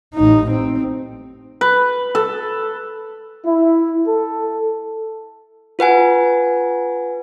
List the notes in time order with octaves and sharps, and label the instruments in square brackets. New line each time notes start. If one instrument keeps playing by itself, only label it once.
[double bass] A1 D#4
C4
[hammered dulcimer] B4
A4
[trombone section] E4
A4
[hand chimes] F4 B4 F#5 G#5